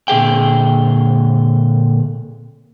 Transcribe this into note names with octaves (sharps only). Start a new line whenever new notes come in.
A#2 D3 G#4 G5